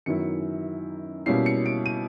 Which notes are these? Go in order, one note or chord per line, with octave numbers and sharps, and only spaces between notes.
F#2 D#3 F#3 B3 E4 C#7
B2 G3 A#3 C#4 E4 C7
C#7
D7
D#7